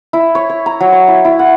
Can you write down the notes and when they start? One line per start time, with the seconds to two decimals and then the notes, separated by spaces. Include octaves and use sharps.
0.13 E4
0.35 C#5
0.49 C#5
0.66 A#5
0.80 F#3
0.92 C#5
1.08 E4
1.25 E4
1.39 F#5